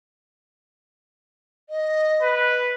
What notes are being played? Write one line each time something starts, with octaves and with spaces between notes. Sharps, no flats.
D#5
B4